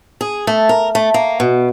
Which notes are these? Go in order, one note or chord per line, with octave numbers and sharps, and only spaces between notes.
G#4
A3
A#4
A3
A#3
B2